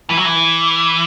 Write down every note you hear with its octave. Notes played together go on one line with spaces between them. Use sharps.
E3
F#3
E3